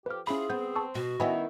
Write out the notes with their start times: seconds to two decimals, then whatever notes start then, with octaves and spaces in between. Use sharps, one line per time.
0.06 F2 G4 B4 F6
0.27 C4 C#4 E4 F4 G#4 B5
0.50 B3 C4 G6
0.76 A5 C#6 E6
0.95 B2 F#4
1.20 D#3 B3 C#4 E4 D#5 G#5 B5